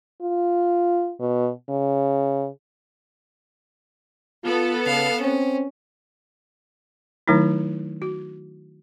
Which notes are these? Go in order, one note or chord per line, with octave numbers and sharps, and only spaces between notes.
F4
B2
C#3
B3 F4 A4
C#3 F5
C4 C#4
D#3 F#3 A3 D#4 E4
F#4